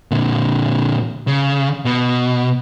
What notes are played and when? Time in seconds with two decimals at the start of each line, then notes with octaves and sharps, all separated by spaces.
0.11 A#2 D3
1.27 C#3
1.85 B2